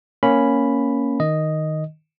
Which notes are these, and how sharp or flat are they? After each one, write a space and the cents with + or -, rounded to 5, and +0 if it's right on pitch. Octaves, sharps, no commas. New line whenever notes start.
A#3 +0 C#4 +0 B5 +0
D#3 +0 D#5 +0